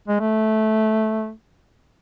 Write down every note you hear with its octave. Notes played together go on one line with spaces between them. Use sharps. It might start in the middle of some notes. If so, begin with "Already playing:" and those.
G#3
A3